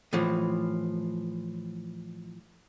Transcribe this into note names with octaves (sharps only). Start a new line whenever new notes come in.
A2 E3 F3